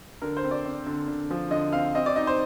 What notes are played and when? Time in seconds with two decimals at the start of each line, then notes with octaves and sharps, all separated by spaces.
0.22 D3 A#4
0.37 C5
0.44 C4
0.51 D5
0.65 C4
0.87 D3
1.08 D3
1.31 F3
1.51 D3 D#5
1.73 C4 F5
1.95 C4 D#5
2.06 D5
2.16 D#4 D#5
2.27 C5